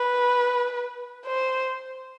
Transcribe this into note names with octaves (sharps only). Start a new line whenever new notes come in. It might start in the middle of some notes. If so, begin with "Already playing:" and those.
Already playing: B4
C5